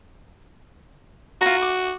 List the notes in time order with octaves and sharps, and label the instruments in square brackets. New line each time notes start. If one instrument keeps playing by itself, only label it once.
[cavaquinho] F4 A#5 [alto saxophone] F#4
[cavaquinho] D6